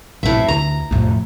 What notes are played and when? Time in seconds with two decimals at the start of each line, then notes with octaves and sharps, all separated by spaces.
0.23 A#1 F#2 A2 C3 E5
0.48 D2 A#5
0.91 F2 A2 C3